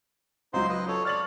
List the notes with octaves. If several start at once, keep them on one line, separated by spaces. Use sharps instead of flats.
C#2 F#3 D#4 C5 C6
B4 D#5
A4 C#5
C#5 D5 F6 A6 F#7